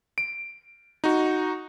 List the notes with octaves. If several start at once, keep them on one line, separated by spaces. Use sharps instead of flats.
D7
D#4 F#4